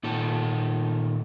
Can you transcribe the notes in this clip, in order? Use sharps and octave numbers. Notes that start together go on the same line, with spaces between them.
A#2 D#3 A4